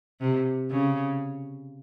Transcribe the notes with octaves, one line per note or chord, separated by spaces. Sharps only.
C3
C#3